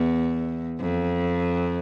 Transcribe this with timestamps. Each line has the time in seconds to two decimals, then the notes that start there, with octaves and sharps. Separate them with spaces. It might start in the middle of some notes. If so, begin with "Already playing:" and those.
Already playing: E2
0.80 F2